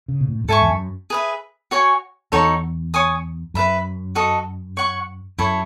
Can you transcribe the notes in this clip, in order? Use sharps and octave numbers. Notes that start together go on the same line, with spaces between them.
C#3
B2
A2
F#2
G#2 A4 E5 G#5 C#6
E2
F#2
G#4 B4 E5
F#4 C#5 G#5
E2 D#4 F#4 A4 C#5
C#5 G#5 D#6
F#2 B4 E5 B5
F#4 A4 D#5
C#5 F#5 C#6
F#2 E4 A4 C#5